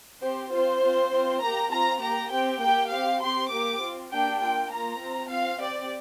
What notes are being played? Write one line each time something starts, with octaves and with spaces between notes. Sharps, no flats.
C4 G4 C5
C4 F4 C5
C4 F4
C4 F4
A#3 G4 A#5
C4 F4 A#5
A#3 G4 A#5
C4 G4 G5
A#3 G4 G5
C4 G4 F5
C4 G4 C6
A#3 G4 D6
C4 F4
A#3 D4 G4 G5
A#3 F4 G5
A#3 F4 A#5
C4 F4
C4 F4 F5
C4 G4 D5